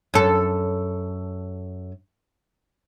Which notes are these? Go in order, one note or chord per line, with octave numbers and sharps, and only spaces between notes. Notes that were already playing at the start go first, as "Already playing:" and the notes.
F#2 A4